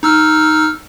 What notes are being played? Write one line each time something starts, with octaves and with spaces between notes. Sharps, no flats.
D#4 E6 F6